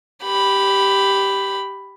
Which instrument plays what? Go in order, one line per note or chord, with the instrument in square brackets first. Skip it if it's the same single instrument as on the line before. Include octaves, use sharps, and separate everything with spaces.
[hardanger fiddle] G4 B5